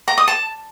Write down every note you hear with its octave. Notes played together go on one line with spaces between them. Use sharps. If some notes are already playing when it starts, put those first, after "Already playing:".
A#5
D#6
A5